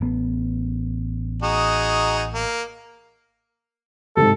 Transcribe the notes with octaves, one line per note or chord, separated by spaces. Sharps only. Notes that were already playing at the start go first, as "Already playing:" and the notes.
A1 B3
D#4 F#4 G#4
A#3
G#2 C3 A4